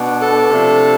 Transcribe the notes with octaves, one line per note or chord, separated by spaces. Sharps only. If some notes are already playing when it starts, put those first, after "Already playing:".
Already playing: B2 B3 D4
A4
C3 F3 A3 D4